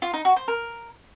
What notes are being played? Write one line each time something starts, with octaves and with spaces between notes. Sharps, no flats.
F4
D#4
F#4
C5
A#4